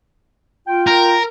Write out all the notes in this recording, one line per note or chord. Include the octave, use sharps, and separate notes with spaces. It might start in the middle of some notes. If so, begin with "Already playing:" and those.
F4 G5
A#4